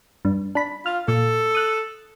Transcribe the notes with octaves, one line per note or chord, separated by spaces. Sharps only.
G2
D4 B5
F4 F6
A#2 A4
D#6 F#6